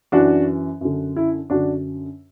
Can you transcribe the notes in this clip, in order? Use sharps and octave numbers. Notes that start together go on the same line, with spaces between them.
F#2 E3 D4 F#4
F#2 D3
E4
F#2 D3 D4 F#4